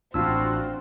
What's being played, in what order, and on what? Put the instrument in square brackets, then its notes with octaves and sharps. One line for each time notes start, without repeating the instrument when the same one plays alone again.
[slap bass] A1 A2 [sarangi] C4 [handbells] D4 E6 [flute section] F4 F#4